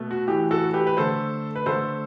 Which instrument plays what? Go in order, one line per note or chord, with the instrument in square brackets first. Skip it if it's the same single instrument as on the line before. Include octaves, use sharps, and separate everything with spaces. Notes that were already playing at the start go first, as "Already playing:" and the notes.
Already playing: [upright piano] B2 A3
F#4
A2 E3 A3 G4
F#4 A4
G4 B4
B4
D3 A3 A4 C5
B4
D3 A3 A4 C5